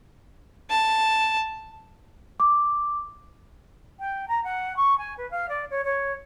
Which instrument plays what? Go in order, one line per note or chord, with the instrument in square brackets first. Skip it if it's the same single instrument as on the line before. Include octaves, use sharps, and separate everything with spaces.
[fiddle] A5
[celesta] D6
[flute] G5
A#5
F#5
C#6
G#5
B4
F5
D5
C#5
C#5